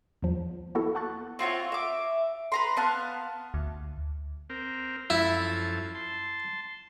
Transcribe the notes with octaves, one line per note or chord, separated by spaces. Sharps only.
E2 F3
A#3 B3 E4 F#4 A4
F#5 A5 C#6 F#6 A6
C4 F4 F#4 C#5
E5 D6
B4 A#5 C6
B3 F5 A5 F#6
D2
C4 A#4
F#2 F3 E4 A4
A5 C6